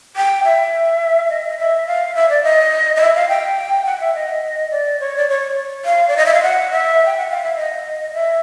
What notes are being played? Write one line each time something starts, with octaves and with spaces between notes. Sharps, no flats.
G5
E5
D#5
D#5
E5
F5
E5
D5
D#5
D#5
E5
F5
G5
F#5
E5
D#5
D5
C#5
D5
C#5
F5
D5
D#5
E5
F5
F#5
E5
G5
F#5
F5
E5
D#5
E5